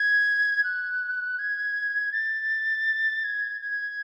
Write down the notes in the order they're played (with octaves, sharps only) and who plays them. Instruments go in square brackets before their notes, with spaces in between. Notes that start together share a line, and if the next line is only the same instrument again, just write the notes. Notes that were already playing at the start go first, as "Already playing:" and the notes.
Already playing: [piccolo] G#6
F#6
G#6
A6
G#6
G#6